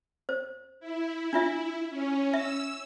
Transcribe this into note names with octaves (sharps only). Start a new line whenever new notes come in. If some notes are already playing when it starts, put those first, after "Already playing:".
C5
E4
D4 F4 E5
C#4
E5 E6